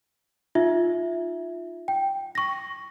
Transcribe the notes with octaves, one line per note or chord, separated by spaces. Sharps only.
D#4 F4 E5
G5
C#6 A#6